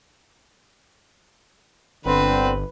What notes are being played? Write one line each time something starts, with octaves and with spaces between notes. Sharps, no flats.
G1 D3 C4 B4